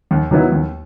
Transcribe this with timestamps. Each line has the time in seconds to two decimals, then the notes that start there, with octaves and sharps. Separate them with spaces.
0.11 D#2
0.31 D#3 F#3 B3 E4
0.52 D#2